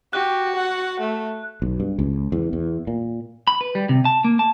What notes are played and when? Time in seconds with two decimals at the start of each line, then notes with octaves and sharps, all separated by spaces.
0.13 F#4 G4 F#6
0.55 F#5
1.00 A3
1.62 B1
1.80 G2
1.99 C#2
2.32 E2
2.53 E2
2.87 A#2
3.47 B5
3.61 B4
3.75 G3
3.89 C3
4.05 A5
4.24 A#3
4.39 A5